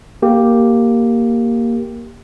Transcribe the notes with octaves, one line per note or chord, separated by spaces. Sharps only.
A#3 G4